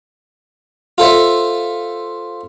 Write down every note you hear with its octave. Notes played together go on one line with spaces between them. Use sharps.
F4 A4 C5 E5